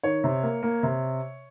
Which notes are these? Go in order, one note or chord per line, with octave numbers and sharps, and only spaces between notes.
D#3 C#5
C3
A#3
A#3
C3